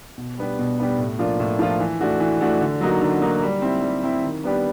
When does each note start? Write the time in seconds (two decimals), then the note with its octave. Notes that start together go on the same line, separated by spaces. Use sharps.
0.18 B2
0.37 G3 B3 D4 G4
0.59 B2
0.79 G3 B3 D4 G4
0.98 A2
1.19 F3 A#3 D4 F4
1.40 A2
1.59 F3 A#3 D4 F4
1.80 E3
2.01 A3 D4 F#4
2.20 E3
2.41 A3 D4 F#4
2.61 D3
2.81 F#3 A#3 D#4 F#4
3.01 D3
3.22 F#3 A#3 D#4 F#4
3.42 G3
3.62 C4 E4
3.82 G3
4.03 C4 E4
4.23 D#3
4.44 G3 B3 D4 G4